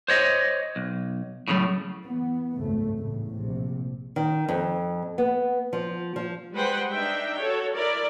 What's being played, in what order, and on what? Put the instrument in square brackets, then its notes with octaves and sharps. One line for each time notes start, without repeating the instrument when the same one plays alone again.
[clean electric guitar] C5 C#5 D#5
B1
A2 C#3 F3 F#3
[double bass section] E3 B3
G#1 C#2 F#2 A3
E2 A2 C#3
A#1 C3
[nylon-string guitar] D#3
F2
B3
F3
F3
[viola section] G3 G#3 B4 C5 F#5 G5
D4 D#4 E5 G5
F#4 A4 C#5
E4 A#4 D5